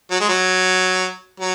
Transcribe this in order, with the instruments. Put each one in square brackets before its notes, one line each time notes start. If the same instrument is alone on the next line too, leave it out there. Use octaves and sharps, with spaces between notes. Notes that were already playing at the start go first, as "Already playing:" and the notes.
[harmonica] F#3
G#3
F#3
F#3